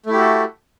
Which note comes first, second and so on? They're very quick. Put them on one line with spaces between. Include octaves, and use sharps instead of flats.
A3 E4 G4 F#4 A4